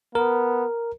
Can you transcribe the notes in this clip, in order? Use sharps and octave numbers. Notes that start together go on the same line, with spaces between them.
B3 A#4